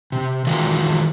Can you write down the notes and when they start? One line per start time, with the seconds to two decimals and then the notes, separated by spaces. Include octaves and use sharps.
0.12 C3
0.47 D#3 E3 G#3 F4 F#4